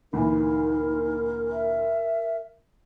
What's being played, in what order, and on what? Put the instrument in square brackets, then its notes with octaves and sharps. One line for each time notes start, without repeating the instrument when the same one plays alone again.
[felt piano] D2 A#2 E3 [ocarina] D#4 [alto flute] A#4
[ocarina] E5